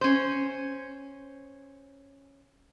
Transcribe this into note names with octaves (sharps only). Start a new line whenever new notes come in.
C#4 C5